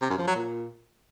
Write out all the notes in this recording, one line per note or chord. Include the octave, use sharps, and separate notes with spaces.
C3
F#2
F3
F#3
A#2